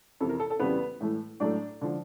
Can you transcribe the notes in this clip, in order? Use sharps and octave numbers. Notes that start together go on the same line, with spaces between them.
F2 C3 E3 A4
A#4
A4
A4
F2 C#3 E3 G3 B3 B4
A2 E3 A3
A2 F#3 A3 D4 D5
D3 F3